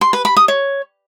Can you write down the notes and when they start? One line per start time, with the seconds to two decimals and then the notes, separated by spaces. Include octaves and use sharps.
0.01 C6
0.13 B4
0.25 B5
0.37 D#6
0.48 C#5